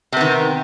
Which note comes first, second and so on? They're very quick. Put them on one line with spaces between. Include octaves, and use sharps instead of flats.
C3 B3 D#3